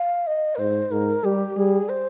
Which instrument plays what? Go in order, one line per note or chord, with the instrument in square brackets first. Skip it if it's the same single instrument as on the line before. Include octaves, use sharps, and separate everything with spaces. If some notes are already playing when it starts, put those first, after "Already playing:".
Already playing: [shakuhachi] F5
D#5
A#4
[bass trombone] G#2 [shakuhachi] C5
[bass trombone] G#2 [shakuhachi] A#4
[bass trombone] G3 [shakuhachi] G4
[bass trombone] G3 [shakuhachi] G#4
[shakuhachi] C5